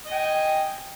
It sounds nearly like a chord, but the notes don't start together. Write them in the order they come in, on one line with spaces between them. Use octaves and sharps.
D#5 G#5 G5